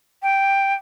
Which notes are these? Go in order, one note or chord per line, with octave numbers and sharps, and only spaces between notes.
G5